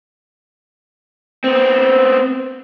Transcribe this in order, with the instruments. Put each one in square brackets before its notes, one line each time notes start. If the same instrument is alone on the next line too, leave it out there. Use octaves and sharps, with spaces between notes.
[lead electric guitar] B3 C4